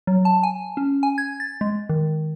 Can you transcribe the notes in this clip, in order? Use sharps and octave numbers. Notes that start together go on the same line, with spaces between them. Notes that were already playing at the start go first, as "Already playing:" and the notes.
F#3
A5
G#5
C#4
G#5
G#6
A6
G#3
D#3